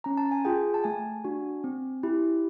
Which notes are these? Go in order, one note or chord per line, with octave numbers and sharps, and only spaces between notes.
C#4 A#5
A5
G#5
F4 G#4 G5
A5
A3 G#5
D4 F#4
C4
E4 G4